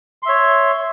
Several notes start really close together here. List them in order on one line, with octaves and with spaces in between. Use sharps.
C6 E5 C#5